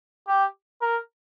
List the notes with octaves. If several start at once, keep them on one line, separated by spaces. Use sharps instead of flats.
G4
A#4